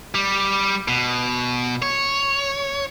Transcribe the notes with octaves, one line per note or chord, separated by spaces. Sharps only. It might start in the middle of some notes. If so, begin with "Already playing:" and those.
G3
B2
C#5